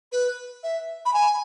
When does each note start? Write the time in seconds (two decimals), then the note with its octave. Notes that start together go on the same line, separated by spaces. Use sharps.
0.12 B4
0.63 E5
1.05 B5
1.13 G#5